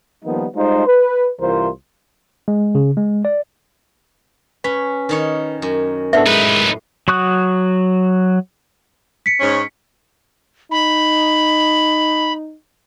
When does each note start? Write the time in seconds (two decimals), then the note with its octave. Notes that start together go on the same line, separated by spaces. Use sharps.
0.25 D#3 F3 G3 A#3 B3 D#4
0.56 G3 G#3 D#4 F4 C5
0.87 B4
1.41 C2 E3 F4 A#4 C5
2.48 G#3
2.75 C#3
2.97 G#3
3.25 D5
4.64 C#4 B4 B6
5.09 D#3 D#4 C#5
5.62 F#2
6.13 A2 B3 D4 A4 E5
6.27 G#3 D#4 B4
7.08 F#3 F#4 C#6 D#6 F#6
9.26 B6 C#7
9.40 G#2 C#4
10.71 D#4 B5